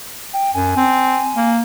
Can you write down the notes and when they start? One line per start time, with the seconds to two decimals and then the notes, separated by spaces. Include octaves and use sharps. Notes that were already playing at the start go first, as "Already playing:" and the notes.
0.34 G5
0.54 F#2 G#5
0.77 C4
1.37 A#3